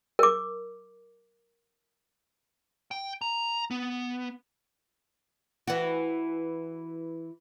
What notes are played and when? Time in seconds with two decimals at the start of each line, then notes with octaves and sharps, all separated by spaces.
0.19 A#4 D6
2.91 G5
3.22 A#5
3.71 B3
5.68 E3 F#4